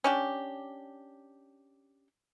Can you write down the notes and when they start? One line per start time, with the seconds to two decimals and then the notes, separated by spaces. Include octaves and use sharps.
0.04 C#4 D4 G4